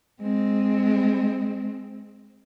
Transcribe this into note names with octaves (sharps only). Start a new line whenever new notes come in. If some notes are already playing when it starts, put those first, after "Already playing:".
G#3 C4